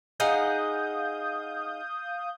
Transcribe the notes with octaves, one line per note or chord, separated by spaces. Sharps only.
D#4 G#4 F5 F#5 D#6 G6